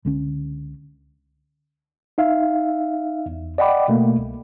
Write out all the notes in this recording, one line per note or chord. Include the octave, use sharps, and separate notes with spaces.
C#2 D3 C#4
D#4 E5 F5
E2
D5 D#5 F#5 G5 B5 D6
B2 A3 A#3
C2